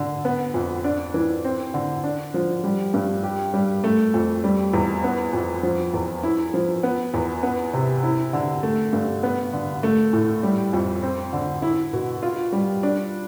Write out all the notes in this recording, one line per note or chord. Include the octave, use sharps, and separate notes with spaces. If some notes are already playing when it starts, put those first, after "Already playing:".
Already playing: D3
B3
F2
D4
E3
C4
D3
D4
F3
G3
G2
G4
G3
A3
F2
G3
E2
B3
F2
F3
E2
E4
F3
B3
E2
B3
C3
E4
D3
A3
G2
B3
D3
A3
A2
G3
F2
C4
D3
E4
B2
F4
G3
D4